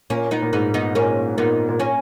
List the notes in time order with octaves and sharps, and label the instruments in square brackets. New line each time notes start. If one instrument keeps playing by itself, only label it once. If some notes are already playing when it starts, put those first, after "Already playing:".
[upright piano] A#2 [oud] A#3 C#4
[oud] B3 D#4
[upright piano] A#2
[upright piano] G#2 [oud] B3 D#4
[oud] B3 D#4
[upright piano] A#2 [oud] A#3 C#4
[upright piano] A#2 [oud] B3 D#4
[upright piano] A#2
[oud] A#3 C#4